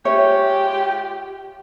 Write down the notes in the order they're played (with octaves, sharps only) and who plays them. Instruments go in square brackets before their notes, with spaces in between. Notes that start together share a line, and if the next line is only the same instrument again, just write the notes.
[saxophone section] G#3 F4 G4 [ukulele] C#5 [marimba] E5